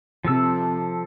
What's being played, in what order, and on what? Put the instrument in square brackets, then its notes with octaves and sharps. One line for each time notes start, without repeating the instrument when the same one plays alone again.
[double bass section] C3 [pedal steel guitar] F3 A4 E6